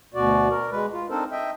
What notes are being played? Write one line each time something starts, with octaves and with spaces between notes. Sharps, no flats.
D2 B2 F#4 D5
A#4
G#3 B4
F4
C4 D4 D#4 A4 A#4 C5
D#5 E5 G5